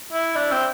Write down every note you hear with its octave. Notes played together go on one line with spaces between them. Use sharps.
E4
D4
C4